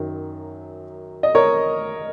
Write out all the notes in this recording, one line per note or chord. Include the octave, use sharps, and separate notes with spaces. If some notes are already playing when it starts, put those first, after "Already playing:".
Already playing: F#2 D#3 F#3
D#5
A#4 C#5